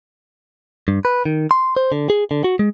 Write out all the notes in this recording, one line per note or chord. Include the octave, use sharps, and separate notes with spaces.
G2
B4
D#3
C6
C5
D3
G#4
D3
F#4
G#3